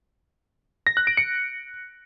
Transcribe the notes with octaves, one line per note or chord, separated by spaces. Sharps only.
A#6
F#6
D7
C#7